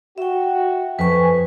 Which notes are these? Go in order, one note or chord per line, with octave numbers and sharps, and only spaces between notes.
F#4 E5 G5
F2 B4 G#5 C#6